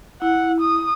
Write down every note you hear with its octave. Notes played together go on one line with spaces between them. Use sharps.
E4 F#5
D#6